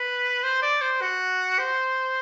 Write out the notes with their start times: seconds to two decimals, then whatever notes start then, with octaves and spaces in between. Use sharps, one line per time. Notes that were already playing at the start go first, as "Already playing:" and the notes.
Already playing: B4
0.43 C5
0.62 D5
0.81 C5
1.01 F#4
1.59 C5